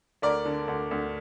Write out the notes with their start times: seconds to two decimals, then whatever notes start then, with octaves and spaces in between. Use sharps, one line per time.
0.22 D2 A#4 D5
0.45 D3
0.68 D2
0.91 D2